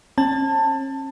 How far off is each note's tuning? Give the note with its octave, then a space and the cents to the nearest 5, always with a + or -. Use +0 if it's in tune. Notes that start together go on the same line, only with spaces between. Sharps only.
C#4 -40 A5 +15